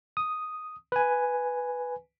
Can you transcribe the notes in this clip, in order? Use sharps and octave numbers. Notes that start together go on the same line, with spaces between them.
D#6
B4 G#5